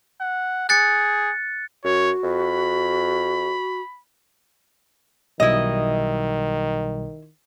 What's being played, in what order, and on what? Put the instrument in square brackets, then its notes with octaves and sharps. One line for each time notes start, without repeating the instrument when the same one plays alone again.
[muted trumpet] F#5
[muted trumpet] G#4 [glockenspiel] F#6 A6 C#7
[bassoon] F#2 [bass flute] F#4 [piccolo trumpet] C#5
[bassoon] F2 [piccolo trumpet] B5
[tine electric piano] B1 B2 G3 [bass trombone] D#3 [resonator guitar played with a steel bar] E4 D#5